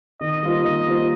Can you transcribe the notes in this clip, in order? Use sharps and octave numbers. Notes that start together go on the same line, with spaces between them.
D#3 D#5
G3 A#3 F4 C5
D#3 D#5
G3 A#3 F4 C5